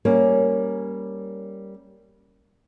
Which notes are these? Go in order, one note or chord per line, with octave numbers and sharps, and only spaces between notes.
G3 A#3 C#4